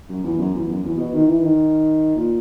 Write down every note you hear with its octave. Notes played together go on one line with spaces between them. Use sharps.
F#2
E2
F#2
E2
F#2
E2
B2
D#3
E3
D#3
A#2